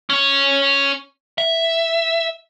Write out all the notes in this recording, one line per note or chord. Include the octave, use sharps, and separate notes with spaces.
C#4 C#5
E5